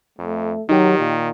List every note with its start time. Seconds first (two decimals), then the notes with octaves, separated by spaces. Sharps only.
0.18 F2 A3
0.69 D#3 F#3 D#4 G4
0.99 A#2